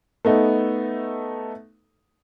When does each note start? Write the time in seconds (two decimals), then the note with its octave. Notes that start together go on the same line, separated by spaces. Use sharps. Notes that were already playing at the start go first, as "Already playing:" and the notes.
0.25 A3 B3 D#4 A4